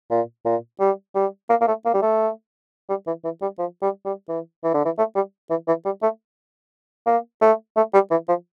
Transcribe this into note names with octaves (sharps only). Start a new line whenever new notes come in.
A#2
A#2
G3
G3
A#3
A#3
A3
A#3
G3
A3
G3
E3
E3
G3
F3
G3
G3
E3
E3
D3
E3
A3
G3
E3
E3
G3
A3
A#3
A3
A3
G3
E3
F3